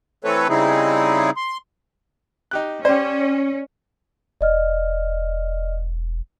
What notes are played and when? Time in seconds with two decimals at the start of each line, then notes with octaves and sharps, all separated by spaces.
0.24 E3 A3 C4 A4 B4 C#5
0.49 C#3 G3 C4 D#4 E4 G#4
1.37 C6
2.51 D#4 G4 F#6
2.85 C#4 G4 C5 D5
4.41 E1 D5 D#5 F6